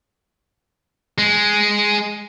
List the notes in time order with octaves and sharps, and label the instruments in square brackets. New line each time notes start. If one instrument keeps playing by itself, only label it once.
[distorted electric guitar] G#3